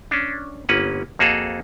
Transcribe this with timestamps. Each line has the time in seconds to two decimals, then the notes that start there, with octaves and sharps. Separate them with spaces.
0.11 C#4 D4
0.69 G1 A#3 C#4 B4 F#5
1.19 F2 A#3 F#4 G#4 A4 F5